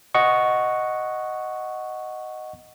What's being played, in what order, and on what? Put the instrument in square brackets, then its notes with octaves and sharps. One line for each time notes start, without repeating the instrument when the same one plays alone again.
[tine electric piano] D#5 F#5 C#6